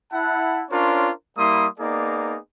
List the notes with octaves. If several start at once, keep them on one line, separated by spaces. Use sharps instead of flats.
E4 F#5 A5
C#4 D4 F4 A#4 C5 C#5
G3 A#3 E4 C6 D#6
A#3 B3 D#4 G#4 D5